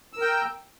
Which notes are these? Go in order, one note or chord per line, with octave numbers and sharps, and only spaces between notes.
A#4 G5 E6